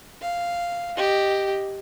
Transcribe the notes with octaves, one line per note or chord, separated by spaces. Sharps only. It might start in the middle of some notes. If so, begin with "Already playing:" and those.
F5
G4 D#5